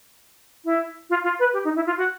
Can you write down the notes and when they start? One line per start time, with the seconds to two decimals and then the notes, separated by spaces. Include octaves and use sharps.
0.65 E4
1.09 F4
1.23 F4
1.39 B4
1.53 G4
1.64 D#4
1.75 E4
1.86 F4
1.97 F#4